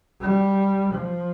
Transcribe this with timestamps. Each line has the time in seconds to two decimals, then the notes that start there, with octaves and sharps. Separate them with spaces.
0.21 G3
0.94 F3